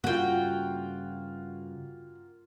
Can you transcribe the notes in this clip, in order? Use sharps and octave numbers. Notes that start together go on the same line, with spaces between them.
G2 C#3 A#3 F4 F#4 G5